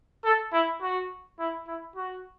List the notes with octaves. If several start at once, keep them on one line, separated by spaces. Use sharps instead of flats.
A4
E4
F#4
E4
E4
F#4